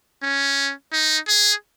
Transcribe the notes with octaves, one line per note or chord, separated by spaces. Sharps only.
C#4
D#4
G#4